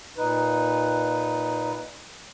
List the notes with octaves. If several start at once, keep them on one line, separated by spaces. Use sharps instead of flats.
A#2 D#4 B4